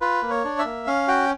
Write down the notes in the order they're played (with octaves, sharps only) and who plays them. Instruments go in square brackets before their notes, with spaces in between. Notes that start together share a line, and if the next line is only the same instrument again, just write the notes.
[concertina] F4 B4
A#3
C#5
D4
E5
A#3
C#4 F5
F#4 G5